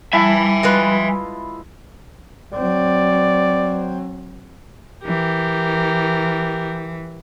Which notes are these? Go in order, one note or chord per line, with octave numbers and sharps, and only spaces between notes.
G3 E4 E5 G#5 A5
G#3 F4 B4
F#3 C4 D5
E3 G4 A#4